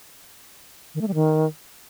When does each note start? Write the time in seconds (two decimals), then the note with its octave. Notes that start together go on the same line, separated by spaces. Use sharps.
0.95 D#3
1.01 A3
1.08 G3
1.14 D#3